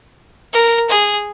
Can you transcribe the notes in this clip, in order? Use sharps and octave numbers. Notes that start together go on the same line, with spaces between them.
A#4
G#4